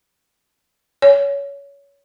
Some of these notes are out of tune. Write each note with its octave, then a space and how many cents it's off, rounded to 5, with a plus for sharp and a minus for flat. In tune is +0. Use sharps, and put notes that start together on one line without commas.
C#5 +20